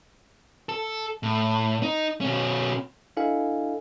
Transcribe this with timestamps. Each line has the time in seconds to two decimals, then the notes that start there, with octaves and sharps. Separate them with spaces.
0.69 A4
1.23 A2
1.83 D#4
2.21 B2 C#4
3.17 D4 E4 A4 D#5 F5 G#5